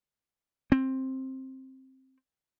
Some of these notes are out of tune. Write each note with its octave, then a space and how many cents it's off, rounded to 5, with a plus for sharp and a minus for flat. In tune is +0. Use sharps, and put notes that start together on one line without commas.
C4 +10